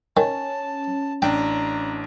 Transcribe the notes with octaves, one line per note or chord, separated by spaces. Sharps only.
D#3 C#4 A5
A1 D4 G5 A#5